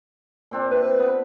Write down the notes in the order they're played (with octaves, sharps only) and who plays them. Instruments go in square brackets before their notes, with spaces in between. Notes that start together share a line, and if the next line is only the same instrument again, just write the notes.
[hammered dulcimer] A#2 C4 D4
[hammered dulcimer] C3 [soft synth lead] B4
[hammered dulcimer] B3